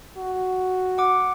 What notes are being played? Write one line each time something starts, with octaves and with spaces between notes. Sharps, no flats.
F#4
F#5 D6